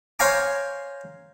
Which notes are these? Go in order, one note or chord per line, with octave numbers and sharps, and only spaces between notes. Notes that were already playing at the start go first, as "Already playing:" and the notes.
C5 C#5 F5 G#5 A#5 D6